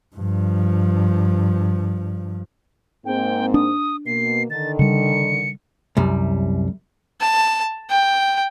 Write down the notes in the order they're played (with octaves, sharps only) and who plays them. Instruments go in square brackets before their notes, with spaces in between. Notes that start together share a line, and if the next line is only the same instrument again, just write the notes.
[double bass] G2 F3
[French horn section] G#2 A#3 C4 [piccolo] G5
[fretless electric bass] D4 [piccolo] D#6
[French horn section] B2 A#3 [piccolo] C7
[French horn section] D3 D#3 [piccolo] A6
[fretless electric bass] C#3 G3 [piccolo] C#7
[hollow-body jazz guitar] C2 F#2 G3
[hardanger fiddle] A5
G5